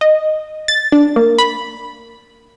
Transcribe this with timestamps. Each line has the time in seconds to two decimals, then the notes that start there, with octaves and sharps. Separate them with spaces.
0.01 D#5
0.68 A6
0.92 D4
1.16 A#3
1.38 B5